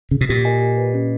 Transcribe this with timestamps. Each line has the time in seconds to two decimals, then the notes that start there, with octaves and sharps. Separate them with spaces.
0.11 C#3
0.21 B2
0.29 A#2 G4
0.45 A#4 D#5 G#5
0.61 G4
0.78 B4 D#5
0.94 C#4